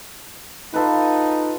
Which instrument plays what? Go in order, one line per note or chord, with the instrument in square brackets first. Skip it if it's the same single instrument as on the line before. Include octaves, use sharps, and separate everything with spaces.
[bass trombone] D#4 [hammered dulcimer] F4 A4 B4